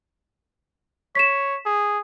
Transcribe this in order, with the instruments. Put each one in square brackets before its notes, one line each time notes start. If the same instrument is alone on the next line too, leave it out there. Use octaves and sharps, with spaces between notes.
[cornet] C#5 [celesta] B6 E7
[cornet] G#4